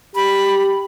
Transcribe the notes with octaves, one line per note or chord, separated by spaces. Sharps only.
G4 B5